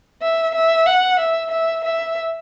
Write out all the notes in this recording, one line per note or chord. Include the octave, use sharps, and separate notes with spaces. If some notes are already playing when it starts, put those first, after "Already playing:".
E5
E5
F#5
E5
E5
E5